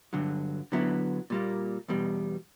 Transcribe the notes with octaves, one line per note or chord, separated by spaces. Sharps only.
G2 D3 F#3
D3 F#3 B3 E4
A#2 G3 A#3
E2 B2 G3